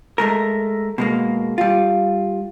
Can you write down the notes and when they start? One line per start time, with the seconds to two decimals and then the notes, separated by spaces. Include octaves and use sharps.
0.18 G#3 A3 A#4
0.98 B2 G#3 A#3
1.58 G3 F4